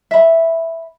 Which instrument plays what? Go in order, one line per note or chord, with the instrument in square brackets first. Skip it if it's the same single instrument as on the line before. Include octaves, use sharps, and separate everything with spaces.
[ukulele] E5 B5